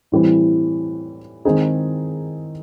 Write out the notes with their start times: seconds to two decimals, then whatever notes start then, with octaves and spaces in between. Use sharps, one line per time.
0.12 A2 E3 G3 C4
1.45 D#3 G#3 C4 D#4 G#4